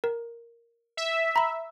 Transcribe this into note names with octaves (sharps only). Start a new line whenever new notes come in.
A#4
E5
A#5 B5